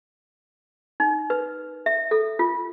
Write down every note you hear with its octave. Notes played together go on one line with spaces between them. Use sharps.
D#4
B4
E5
A4
F4